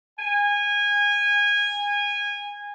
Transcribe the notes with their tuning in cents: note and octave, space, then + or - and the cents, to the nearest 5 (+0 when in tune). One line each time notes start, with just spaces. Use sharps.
G#5 -20